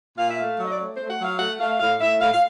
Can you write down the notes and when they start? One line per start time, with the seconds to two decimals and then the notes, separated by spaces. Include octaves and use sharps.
0.18 A#2 F5
0.29 E5
0.39 A3 F5
0.59 F#3
0.65 D#5
0.71 D5
0.79 A3 C#5
0.95 A3 C5
1.10 F#5
1.19 F#3
1.25 F5
1.39 A3 F#5
1.60 A3 F5
1.79 A2 F5
2.00 A2 E5
2.20 A2 F5
2.33 F5